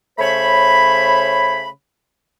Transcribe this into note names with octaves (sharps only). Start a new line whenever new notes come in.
C#3 A3 C5 C#5 B5